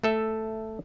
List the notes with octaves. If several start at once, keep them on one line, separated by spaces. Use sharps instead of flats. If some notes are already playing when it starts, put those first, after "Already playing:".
A3 A4 E5